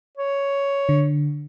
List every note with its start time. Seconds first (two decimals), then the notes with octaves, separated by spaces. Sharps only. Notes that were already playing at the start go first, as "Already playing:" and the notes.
0.17 C#5
0.89 D3